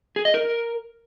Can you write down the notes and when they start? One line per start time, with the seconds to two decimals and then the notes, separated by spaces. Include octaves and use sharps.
0.16 G#4
0.25 D#5
0.34 A#4